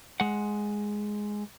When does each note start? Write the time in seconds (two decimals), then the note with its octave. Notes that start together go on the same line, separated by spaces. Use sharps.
0.20 G#3 F#5